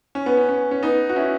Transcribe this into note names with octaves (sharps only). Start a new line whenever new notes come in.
C#4
B3
C#4
C#4
C#4
B3 D#4
F#4
C#4 E4